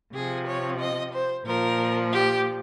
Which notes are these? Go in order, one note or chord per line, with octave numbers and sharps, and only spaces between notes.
C3 F3 G#4
C#5
D#5
C5
A#2 F3 A#4
G4